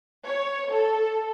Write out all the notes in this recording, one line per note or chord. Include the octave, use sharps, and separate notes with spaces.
C#5
A4